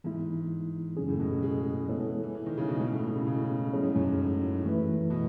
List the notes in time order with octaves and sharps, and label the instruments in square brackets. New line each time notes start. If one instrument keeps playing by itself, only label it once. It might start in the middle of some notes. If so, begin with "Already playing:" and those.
[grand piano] G#2 [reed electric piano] E3 B3 E4
[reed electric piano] F#2 C#3 F#3 C#4 G#4
[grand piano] A2
B2
G#3
G#3
[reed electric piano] G#3 B3 E4 A4 C#5
[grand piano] E3
E3
E3
D#3
C#3
B2
[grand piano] B2 [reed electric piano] G#3 C#4 E4
[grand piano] A2
B2
C#3
C#3
B2
[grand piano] B2 [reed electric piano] F#3 C#4 E4 G#4 C#5
[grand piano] G#2
F#2
G#2
A2
[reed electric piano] E3 A3 E4 B4
[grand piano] B2